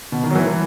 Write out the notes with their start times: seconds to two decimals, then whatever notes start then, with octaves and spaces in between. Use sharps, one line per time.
0.12 B2
0.23 D#3
0.31 F#3
0.35 E3
0.47 E3